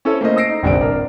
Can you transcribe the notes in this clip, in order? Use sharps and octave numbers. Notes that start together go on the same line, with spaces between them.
C#4 E4 A4 C5 C#5
A3 A#3 C#4 E4 C5 D#5
D#6 E6 A#6 C7 D7
D#4
F1 A#1 D3 G3 C4 D7
D1 D4 A#4